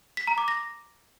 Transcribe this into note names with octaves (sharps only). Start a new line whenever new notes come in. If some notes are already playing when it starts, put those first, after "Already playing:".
B6
A#5
D6
A#6